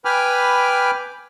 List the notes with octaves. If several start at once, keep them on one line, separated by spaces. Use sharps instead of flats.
B4 G5 G#5 B5 D6 F6